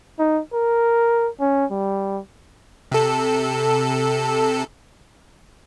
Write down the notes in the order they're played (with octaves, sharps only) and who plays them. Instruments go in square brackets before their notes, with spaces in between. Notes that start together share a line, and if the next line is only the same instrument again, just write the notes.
[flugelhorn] D#4
A#4
C#4
G3
[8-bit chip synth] C3 A4